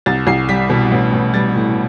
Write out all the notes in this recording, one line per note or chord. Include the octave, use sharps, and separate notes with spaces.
C2 A6
C2 C7
G3 B6
B2
A1
A1
G3 A6
A2